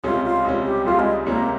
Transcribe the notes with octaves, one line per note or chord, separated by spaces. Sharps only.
C#2 C3 G3 C#4 F4
F4
C#2 C3 G3 C#4
G4
C#2 C3 G3 C#4 F4
G#3
C#2 C3 G3 A#3 C#4